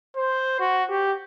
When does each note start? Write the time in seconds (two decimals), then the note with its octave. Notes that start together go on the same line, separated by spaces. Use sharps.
0.17 C5
0.60 F#4
0.90 G4